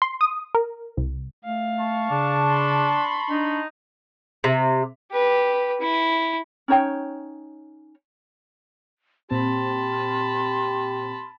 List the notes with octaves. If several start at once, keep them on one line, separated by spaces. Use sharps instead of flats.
C6
D#6
A#4
C2
A3 F5
A5 C#6
C#3 D4
B5 C6
D4 D#4
C3
G4 B4
E4
C#4 D#4 C#5 G5
A#2 C4 G4 A5 B5 C6